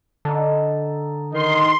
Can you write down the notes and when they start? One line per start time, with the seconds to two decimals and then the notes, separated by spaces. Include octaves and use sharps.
0.25 D3 D#4 A4
1.33 D#3 D#4 C6